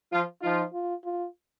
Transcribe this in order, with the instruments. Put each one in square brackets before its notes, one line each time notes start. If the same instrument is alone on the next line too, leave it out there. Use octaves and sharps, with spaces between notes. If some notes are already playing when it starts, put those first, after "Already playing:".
[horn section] F3 F4
[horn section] F3 F4 [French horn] D#4
[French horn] F4
F4